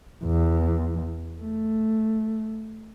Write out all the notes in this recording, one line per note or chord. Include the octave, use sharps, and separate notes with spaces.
E2
A3